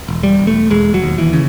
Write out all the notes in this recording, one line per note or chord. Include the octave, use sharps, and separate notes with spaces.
E1
G3
E1
A3
E1 G#3
F#3
D#2
E3
C#3